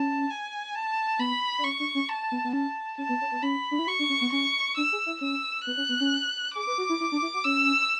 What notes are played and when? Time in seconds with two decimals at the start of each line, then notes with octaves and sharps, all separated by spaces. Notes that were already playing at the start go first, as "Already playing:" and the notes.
Already playing: C#4 A5
0.30 G#5
0.74 A5
1.19 B3 B5
1.58 D4
1.64 C#4 C#6
1.80 D4
1.95 C#4
2.09 A5
2.32 B3
2.44 B3
2.53 C#4 A5
2.98 C#4 A5
3.09 B3
3.21 C#4
3.32 B3
3.42 C#4 B5
3.71 D4
3.79 E4
3.87 F#4 C#6
3.99 D4
4.09 C#4
4.21 B3
4.32 C#4 C#6
4.77 D4 E6
4.92 G#4
5.06 E4
5.21 C#4 E6
5.66 B3 F#6
5.77 C#4
5.89 B3
6.00 C#4
6.55 G#4 D6
6.67 B4
6.78 F#4
6.89 E4
7.00 E4
7.12 D4
7.22 E4
7.34 F#4
7.45 C#4 E6